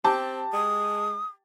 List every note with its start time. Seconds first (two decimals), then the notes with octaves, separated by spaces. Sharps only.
0.04 C4 G4 A5
0.53 G#3 D#6